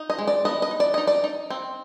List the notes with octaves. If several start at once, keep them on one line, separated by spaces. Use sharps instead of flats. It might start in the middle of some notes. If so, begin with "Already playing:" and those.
Already playing: D#4
D#5
G#3
D5
B3 D#5
D#5
D#4
D5
D#4 D#5
D5
D#4
C4